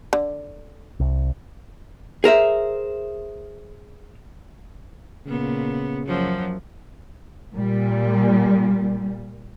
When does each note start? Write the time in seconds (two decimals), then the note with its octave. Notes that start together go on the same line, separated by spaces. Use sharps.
0.13 D3
1.00 C2
2.24 G#4 A#4 C5 E5
5.26 A#2 C#3 B3
6.07 F#2 F3 F#3
7.54 A#2 G3